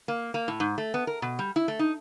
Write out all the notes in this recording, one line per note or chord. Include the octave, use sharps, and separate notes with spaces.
A#3
A#3
A2
G#2
A3
B3
A#4
B2
G3
E4
A3
D#4